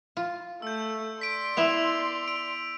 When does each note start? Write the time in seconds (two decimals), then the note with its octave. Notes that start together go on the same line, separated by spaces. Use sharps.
0.17 F4
0.62 A3 E6 G6
1.21 D5 C6 B6 D7
1.57 B3 E4 E5 E6 F7
2.28 D7